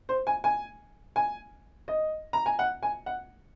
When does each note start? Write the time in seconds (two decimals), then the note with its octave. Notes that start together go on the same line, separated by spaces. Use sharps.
0.09 C5
0.27 G#5
0.44 G#5
1.16 G#5
1.88 D#5
2.33 A#5
2.46 G#5
2.59 F#5
2.83 G#5
3.06 F#5